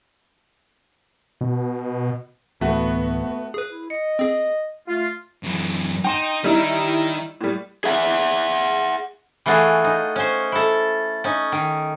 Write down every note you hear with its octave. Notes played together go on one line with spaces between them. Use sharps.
B2
D1 E3 A3 B3 F#4
G#4 B4
E4
D#5 C#7
C4 G#4
A3 F4
F#2 E3
D#4 G5 C6 E7
D#3 G3 D#4 E4
A2 G3
G#4 E5 F#5
E3 A3 F4 F#4 G#4
D#4
C#4 C5
E4 A4
C#4 D#4
D#3